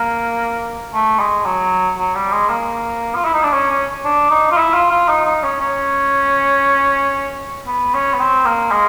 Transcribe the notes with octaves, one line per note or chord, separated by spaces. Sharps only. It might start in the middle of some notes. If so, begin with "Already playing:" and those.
Already playing: A#3
A3
G#3
F#3
F#3
G3
G#3
A#3
F4
E4
D#4
D4
C#4
C#4
D4
D#4
F4
E4
F4
F4
D#4
D#4
C#4
C#4
B3
C#4
B3
C4
A#3
G#3